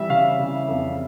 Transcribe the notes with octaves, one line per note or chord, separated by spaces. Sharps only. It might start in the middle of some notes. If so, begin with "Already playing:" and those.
Already playing: E3 G3 E5
C#3 F5
C#3
F2